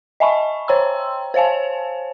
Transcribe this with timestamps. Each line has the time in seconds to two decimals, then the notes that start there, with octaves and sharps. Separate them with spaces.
0.20 D#5 E5 G#5 A5 B5 C#6
0.68 C5 C#5 G5 A#5 C6 E6
1.34 C5 C#5 F5 G#5 A5